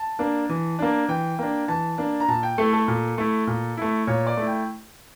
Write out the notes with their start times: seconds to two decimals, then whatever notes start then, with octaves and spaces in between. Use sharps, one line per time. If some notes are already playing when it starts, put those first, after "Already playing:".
Already playing: A5
0.19 A#3 D4
0.49 E3
0.79 A#3 D4
1.09 E3 G5
1.39 A#3 D4
1.68 E3 A5
1.98 A#3 D4
2.20 A#5
2.28 A#2 A5
2.43 G5
2.58 A3 E4 A4
2.73 A4
2.88 A#2
3.18 A3 E4
3.47 A#2
3.77 A3 E4
4.07 A#2 C#5
4.27 D5
4.37 A3 E4
4.47 G5